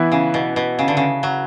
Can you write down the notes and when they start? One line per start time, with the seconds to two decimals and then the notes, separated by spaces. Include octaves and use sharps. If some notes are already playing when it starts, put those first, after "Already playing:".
Already playing: E3 B3 E4
0.12 C#3
0.34 B2
0.56 B2
0.79 C#3
0.88 D3
0.97 C#3
1.23 F#3